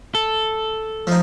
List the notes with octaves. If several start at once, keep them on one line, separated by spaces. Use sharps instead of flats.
A4
F3 D#4